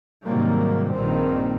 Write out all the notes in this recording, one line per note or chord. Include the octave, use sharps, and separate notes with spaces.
G#2 C3 D#3 F#3 G3 A#3
A#1 G2 A#2 D#3 C4